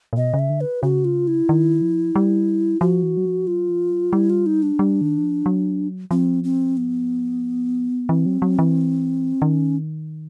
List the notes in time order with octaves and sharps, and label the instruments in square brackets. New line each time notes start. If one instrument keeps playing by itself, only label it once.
[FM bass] A#2
[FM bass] B2 [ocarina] D#5
[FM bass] C#3
[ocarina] E5
[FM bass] D3
[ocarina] B4
[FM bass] C#3 [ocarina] F#4
[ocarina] F4
E4
[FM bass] D#3
F3
G3
[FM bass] F3 [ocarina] F#4
[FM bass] E3
F#3
F3
[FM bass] F#3 [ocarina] F4
[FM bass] F3
F#3
[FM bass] G3 [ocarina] E4
[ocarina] F4
D#4
D4
[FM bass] G3
D#3
E3
F3
F#3
[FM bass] F3 [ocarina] C4
[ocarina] C4
B3
[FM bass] E3 [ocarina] C4
[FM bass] F#3
F#3
E3
[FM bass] D#3 [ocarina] C#4